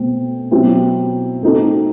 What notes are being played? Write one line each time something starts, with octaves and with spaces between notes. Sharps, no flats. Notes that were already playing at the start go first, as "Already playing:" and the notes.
Already playing: B2 A3 C4
B2 F#3 C4 E4
A3 C4 D#4 F#4 A4